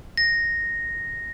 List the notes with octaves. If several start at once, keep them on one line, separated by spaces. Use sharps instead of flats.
A#6